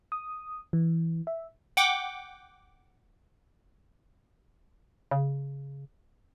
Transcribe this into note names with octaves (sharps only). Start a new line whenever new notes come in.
D#6
E3
E5
F#5 G5 D6
C#3